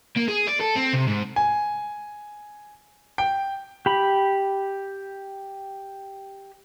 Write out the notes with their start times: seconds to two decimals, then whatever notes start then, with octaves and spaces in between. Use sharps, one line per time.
0.16 A#3
0.28 G#4
0.47 D5
0.60 A4
0.75 C4
0.93 C3
1.07 G#2
1.36 G#5
3.18 G5
3.86 G4 B5